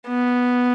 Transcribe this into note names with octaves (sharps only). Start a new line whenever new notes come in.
B3